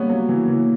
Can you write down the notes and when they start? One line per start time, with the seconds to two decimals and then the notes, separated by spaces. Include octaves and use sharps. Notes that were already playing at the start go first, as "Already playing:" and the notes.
Already playing: G3 A#3 B3 C#4
0.09 F#3
0.29 E3
0.48 E3